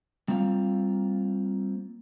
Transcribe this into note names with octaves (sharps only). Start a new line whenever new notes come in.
G3 A#3 C4 F4 F5